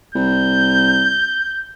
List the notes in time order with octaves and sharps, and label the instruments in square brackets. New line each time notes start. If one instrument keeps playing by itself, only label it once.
[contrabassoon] C2 [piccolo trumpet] G6